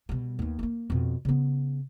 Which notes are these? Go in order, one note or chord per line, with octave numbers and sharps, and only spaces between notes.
B2 G3
D#2 B3
A3 A#3
F2 B2
C#3 B3